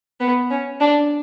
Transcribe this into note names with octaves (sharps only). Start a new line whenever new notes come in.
B3
C#4
D4